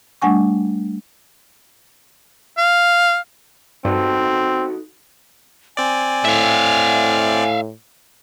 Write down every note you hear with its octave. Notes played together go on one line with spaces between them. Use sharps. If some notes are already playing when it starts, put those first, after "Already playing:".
G3 A3 D4 F#5 G#5 C#6
F5
G2 C4 D#4 F#4 A4
C4 D5 G#5
A2 E5 F5